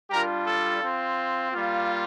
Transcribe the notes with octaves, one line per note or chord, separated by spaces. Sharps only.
G3 D4 F4 G4 A#4
A4
C4 F4
G3 A#3 F4